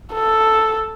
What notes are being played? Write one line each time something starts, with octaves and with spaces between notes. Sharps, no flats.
A4